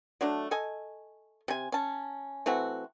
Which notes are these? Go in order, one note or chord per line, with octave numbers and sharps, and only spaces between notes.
F#3 A3 D4
A4 D#5 G#5
C3 G#5
C#4 A5
E3 A3 C4 F#4